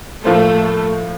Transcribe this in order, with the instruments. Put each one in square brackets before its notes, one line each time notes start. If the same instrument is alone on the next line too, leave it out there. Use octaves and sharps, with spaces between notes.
[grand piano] A2 F3 A#3 F4 C5 [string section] A3